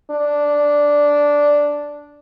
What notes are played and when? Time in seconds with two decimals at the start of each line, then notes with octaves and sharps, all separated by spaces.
0.11 D4